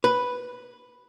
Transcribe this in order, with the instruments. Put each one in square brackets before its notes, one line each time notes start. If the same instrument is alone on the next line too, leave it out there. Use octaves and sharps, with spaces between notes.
[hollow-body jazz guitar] B4